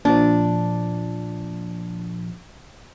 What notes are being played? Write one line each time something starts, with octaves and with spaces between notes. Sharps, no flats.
A#2 F3 D4